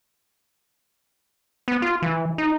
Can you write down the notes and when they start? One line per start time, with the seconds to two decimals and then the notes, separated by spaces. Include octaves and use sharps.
1.68 B3
1.82 F4
2.02 E3
2.38 D#4